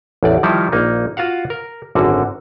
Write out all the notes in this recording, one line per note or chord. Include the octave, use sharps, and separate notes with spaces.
A1 E2 D5
D#3 F3 G3 D#4 E4
A#1 A#3 D#4
F4 F#4 F5 F#5
A#4
G#1 F#2 D3 F#4